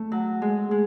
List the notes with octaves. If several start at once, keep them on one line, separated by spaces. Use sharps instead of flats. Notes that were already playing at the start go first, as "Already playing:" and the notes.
Already playing: A3
F#3
G#3
G#3